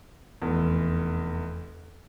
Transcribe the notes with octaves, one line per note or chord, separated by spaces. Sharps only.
F1 E2